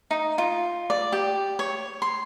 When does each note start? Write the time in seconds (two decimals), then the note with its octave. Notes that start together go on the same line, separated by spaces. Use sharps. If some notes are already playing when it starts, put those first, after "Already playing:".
0.11 D#4
0.38 F4
0.90 D5
1.12 G4
1.59 C#5
2.02 C6